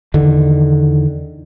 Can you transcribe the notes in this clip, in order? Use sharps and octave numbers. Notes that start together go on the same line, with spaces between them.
E2 D3 D#3